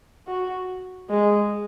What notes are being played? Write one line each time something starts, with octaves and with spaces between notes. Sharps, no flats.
F#4
G#3